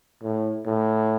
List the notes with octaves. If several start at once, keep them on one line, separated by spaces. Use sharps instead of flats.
A2
A2